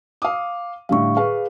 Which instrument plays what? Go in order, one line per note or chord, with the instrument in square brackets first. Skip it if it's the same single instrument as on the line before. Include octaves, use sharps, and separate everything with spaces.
[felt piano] F5 D#6 [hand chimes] D6
[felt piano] A2 D3 G3 [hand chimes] F5 C#6
[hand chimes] G#4 [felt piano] B4 F5